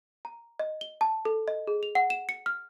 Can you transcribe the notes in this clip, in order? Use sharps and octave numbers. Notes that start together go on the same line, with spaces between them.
A#5
D#5
G7
A5
A4
D#5
G#4
F7
F#5
E7
C#7
F6